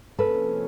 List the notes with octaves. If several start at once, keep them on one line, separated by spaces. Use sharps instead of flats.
C3 F3 A#3 C#4 A4 B4